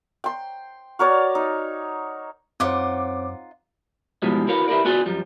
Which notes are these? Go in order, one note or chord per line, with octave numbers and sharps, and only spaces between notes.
G5 C6
F#4 A#4 C#5 D5
D#4
F#2 C4 D#4 F4 C5 C#5 F#5 D6
E2 B2 E3 F3 G3 G#3
E4 F#4 A#4 B4 C#5 F5
E4 G4 A#4 B4 D5
B3 F4 F#4 G#4 D5 C6
F#2 F3 G3